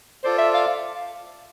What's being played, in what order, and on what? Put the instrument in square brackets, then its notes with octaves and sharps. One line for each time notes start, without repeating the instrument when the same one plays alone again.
[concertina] F4 A4 D5 [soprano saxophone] C5
[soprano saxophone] E5
F5